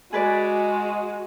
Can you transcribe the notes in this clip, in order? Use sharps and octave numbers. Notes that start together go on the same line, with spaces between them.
G#3 F#4 G#4 B4 D5